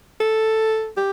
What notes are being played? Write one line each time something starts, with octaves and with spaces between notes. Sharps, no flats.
A4
G4